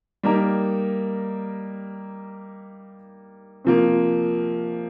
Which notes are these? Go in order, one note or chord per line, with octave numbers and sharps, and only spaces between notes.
G3 A#3 D#4 A#4
C3 F3 A#3